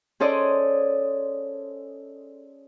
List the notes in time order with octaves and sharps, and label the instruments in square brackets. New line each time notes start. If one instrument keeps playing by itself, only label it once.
[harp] C#4 G#4 A4 C5 D5 D#5